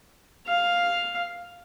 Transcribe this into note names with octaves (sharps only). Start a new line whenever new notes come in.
F5